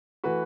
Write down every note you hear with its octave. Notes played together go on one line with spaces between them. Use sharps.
E3 A3 F#4 B4